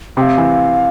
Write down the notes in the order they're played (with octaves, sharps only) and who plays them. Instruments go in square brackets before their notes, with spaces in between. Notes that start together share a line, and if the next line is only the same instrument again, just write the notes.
[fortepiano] C3 [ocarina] G5
[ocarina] F5
[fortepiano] E3